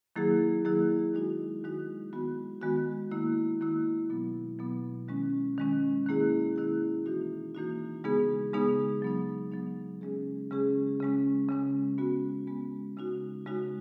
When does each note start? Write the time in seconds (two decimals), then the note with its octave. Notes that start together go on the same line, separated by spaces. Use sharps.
0.16 D#3 F#3 A#3 E4 G#4
0.65 D#3 F#3 A#3 E4 G#4
1.14 D#3 G#3 D#4 F#4
1.64 D#3 G#3 D#4 F#4
2.13 D#3 G#3 B3 F#4
2.62 D#3 G#3 B3 F#4
3.11 D#3 A#3 E4
3.61 D#3 A#3 E4
4.10 B2 F#3 B3
4.59 B2 F#3 B3
5.08 D#3 G#3 C#4
5.58 D#3 G#3 C#4
6.06 D#3 A#3 E4 G#4
6.56 D#3 A#3 E4 G#4
7.06 E3 A#3 D#4 F#4
7.55 E3 A#3 D#4 F#4
8.04 C#3 G#3 B3 D#4 G#4
8.53 C#3 G#3 B3 D#4 G#4
9.02 F#3 B3 D#4
9.52 F#3 B3 D#4
10.01 C#3 G#3 C#4 G#4
10.51 C#3 G#3 C#4 G#4
11.00 C#3 G#3 C#4
11.49 C#3 G#3 C#4
11.98 G#3 B3 F#4
12.47 G#3 B3 F#4
12.97 C#3 G#3 D#4 F#4
13.46 C#3 G#3 D#4 F#4